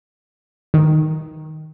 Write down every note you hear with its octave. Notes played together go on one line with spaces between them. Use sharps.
D#3